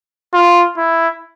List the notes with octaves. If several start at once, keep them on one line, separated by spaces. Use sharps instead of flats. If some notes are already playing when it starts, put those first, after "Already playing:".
F4
E4